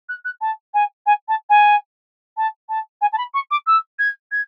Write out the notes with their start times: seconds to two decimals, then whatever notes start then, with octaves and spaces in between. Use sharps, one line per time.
0.08 F#6
0.24 F#6
0.41 A5
0.74 G#5
1.06 G#5
1.28 A5
1.49 G#5
2.37 A5
2.68 A5
3.01 G#5
3.12 A5
3.17 B5
3.34 C#6
3.50 D6
3.66 E6
3.99 G#6
4.31 G#6